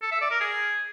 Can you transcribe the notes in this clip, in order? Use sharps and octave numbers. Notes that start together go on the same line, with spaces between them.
A4
E5
D5
A#4
G#4